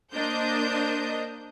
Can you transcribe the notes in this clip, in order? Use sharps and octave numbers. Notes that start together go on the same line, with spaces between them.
A#3 D4 A#4 C5 D#5 G6